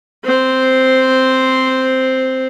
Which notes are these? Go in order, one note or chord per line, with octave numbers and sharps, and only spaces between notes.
C4 C5